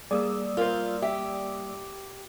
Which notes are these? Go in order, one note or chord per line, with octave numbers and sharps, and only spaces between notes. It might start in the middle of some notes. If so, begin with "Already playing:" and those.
G3 A#3 G#4 D5 D#6 E6
F4 A#4 C5
G4 E5